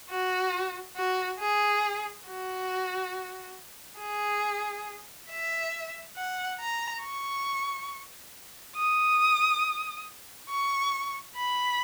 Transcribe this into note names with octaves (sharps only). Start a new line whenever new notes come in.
F#4
F#4
G#4
F#4
G#4
E5
F#5
A#5
C#6
D#6
C#6
B5